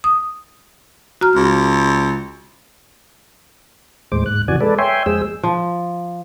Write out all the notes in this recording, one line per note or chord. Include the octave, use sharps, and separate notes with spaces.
D#6
F#4 A#5 F6
C#2
D#2 A2 G#3 C5 D6
G#2 F#6
F2 C3 E3 F#4 D5 G#5
G#3 A4 B4 D5
C#5 E5 G5 G#5 C6
F2 G#3 G#4 C5 E6
F3